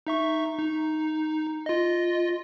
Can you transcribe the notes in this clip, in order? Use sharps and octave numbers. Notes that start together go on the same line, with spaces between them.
D#4 E5 C#6
D#4
F4 D#5